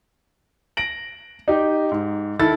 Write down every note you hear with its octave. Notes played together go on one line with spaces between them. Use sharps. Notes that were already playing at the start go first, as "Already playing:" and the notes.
A#6 D7 F#7
D#4 G4
G#2
D#3 E4 A4 A6